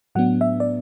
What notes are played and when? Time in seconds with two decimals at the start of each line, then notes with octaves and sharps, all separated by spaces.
0.15 A2 F#3 B3 D4 F#5
0.41 E5
0.60 D5